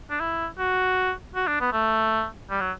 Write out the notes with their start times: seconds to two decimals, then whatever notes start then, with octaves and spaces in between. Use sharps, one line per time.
0.10 D4
0.20 E4
0.59 F#4
1.35 F#4
1.47 D4
1.61 B3
1.72 A3
2.50 G3
2.61 F#3